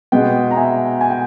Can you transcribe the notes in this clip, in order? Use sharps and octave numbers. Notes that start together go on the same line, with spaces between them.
B2 G#3 B3 D#5 G5
A#5
E5 G#5
G#5
G5